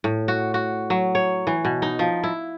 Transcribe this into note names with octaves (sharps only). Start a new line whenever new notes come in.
A2
F#4
F#4
F#3
C#5
E3
B2
D#4
F3
E4